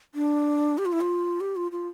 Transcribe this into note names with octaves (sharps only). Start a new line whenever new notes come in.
D4
G4
F4
E4
F4
G4
F4
F4